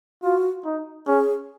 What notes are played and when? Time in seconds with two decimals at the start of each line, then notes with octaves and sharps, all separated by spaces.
0.23 F4 F#4
0.65 D#4
1.07 C#4 G#4